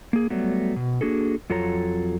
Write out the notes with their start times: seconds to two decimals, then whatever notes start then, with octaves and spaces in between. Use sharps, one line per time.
0.13 A#3 G#4
0.30 F#3 G3 A3 B3
0.76 B2
1.01 A#3 D4 F#4 G#4 A4
1.50 F2 F#3 F4 A4 C#5 A#5